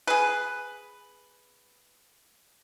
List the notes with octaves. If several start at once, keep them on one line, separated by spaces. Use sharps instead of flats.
G#4 B4